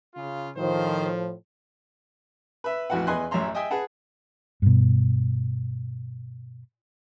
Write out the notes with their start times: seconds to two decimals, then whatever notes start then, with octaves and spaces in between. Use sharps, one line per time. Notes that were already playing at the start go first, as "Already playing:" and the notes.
0.15 C#3 F4
0.57 A2 D#3 F3 C5
2.64 B4 E5
2.90 A1 F2 E3 F#4 B4 F#5
3.07 E2 B4 D#5 G#5 C6 F#6
3.31 A1 F#2 C#5 E5 A#5 C6
3.55 D#5 E5 G5 G#5 D#6
3.70 G#4 B4 F#5 A5
4.62 G2 B2